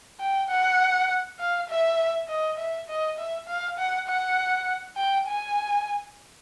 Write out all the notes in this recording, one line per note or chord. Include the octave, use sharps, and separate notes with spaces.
G5
F#5
F5
E5
D#5
E5
D#5
E5
F5
F#5
F#5
G5
G#5